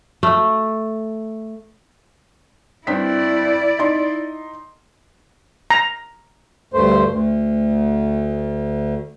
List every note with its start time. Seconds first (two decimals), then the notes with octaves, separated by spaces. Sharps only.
0.23 A3
2.87 G2 C4 E4 D5 B6
3.79 D#4 C6
5.70 A#5
6.74 D2 G2 A3 C5
7.09 D2